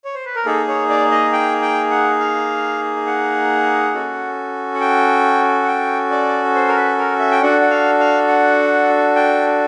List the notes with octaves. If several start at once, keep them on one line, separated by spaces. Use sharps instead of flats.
C#5
C5
B4
A#4
A#3 D#4 G#4 A4
C#5
D5
D#5
G5
G5
F#5
F5
F#5
C#4 F#4 A4
F#5
G5
F#5
G5
D5
C5
A#4
B4
A#4
E5
G5
D4 F#4 A4 F#5
F#5
F5
F5
F#5
G5